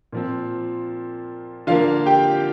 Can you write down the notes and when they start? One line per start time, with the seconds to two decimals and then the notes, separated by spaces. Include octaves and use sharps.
0.13 A#2 F3 C4
1.67 D3 F3 A#3 F4 F5
2.06 G4 G5